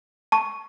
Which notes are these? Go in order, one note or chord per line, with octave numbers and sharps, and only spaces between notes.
A5 C#6